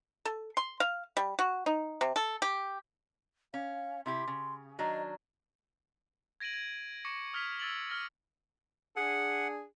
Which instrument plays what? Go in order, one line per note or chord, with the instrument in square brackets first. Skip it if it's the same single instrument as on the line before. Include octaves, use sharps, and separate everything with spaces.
[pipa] A4
C6
F5
G3
F#4
D#4
C3
A4
G4
[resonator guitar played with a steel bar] C#4 [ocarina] F5
[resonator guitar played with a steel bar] C3 E4 G4 [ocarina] C6
[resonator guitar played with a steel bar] C#3
[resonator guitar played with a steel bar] D#3 F#3 D4 [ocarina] D#5
[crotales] G#6 A#6 D7 D#7 F#7
G#6
C#6 D6 A#6 C#7
D#6 F6 G#6 B6 F7
E6 G#6 A6 D7 F#7
F6 A#6
[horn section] D4 G#4 [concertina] F#5